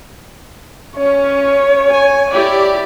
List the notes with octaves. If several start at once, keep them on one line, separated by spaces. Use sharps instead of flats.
C#4 C#5
G#5
E4 G4 D5